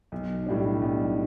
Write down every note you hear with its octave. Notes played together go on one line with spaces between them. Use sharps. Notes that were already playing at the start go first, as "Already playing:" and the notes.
B1
A2 G3 D4
B1